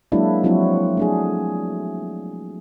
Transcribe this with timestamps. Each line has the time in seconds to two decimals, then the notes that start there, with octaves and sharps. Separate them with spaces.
0.12 F#3 G#3 A#3 D4 E4
0.44 F3 F#3 C4 E4 F#4
0.97 A3 D4 G#4